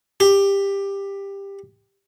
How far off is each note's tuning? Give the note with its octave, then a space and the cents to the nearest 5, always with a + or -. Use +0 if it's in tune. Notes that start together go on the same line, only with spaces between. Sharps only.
G4 +15